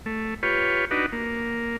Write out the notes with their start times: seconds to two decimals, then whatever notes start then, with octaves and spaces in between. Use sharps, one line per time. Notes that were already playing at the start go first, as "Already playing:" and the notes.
0.06 A3
0.43 F4 G4 B4 C#5
0.91 D4 D#4 F#4 B4
1.12 A#3